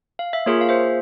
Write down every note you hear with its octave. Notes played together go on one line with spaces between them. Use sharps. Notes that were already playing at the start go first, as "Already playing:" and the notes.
F5
E5
A#3 F4 G#4 A#4 C#5
F5
C5 E5